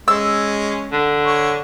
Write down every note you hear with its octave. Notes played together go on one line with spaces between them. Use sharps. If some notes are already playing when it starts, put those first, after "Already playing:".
G#3 C#4 E6
D3
C#5